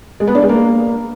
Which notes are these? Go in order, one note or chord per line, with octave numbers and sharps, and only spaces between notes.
G#3
B3
D4
G#3
A#3